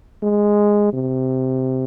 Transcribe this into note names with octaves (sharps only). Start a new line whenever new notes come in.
G#3
C3